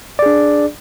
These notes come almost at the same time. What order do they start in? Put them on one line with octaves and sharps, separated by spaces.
D5 G#4 D4